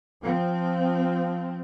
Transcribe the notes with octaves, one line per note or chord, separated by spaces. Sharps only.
F3 C4